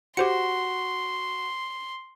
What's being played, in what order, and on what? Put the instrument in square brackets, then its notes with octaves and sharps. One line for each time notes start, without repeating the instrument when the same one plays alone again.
[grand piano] F#4 [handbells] G4 C5 C#7 [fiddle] C6